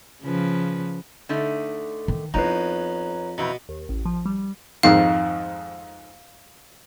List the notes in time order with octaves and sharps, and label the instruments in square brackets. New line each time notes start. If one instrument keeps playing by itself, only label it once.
[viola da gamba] C#3 F3 B4
[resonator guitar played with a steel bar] D3 A3 D#4
[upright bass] D#3
[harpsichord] F2 [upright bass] B3 E4 [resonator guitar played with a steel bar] D#4 [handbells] B4 C#5 A#5
[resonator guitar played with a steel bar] F2 E3 A#5 [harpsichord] B2
[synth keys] D#2
A1
F3
G3
[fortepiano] F2 G#2 D#3 [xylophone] F5